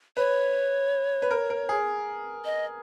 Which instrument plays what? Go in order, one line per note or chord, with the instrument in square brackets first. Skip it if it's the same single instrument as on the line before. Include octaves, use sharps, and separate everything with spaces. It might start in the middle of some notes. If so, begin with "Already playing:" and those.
[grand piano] B4 [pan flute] C#5
[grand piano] B4
A#4
A#4
G#4
[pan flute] D#5